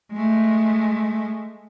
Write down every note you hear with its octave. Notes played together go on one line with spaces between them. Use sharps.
G#3 A3